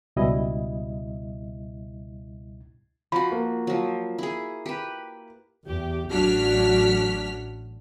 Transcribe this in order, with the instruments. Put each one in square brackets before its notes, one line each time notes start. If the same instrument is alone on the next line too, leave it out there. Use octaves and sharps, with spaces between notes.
[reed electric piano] C#2 B2 G3 E4 D#5
[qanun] F3 F#4 [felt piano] B5
[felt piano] A#3
[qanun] F3 F#3
E4 G#4
G4 B4
[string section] E2 G4
A1 F#3 D4 F#4 F6 B6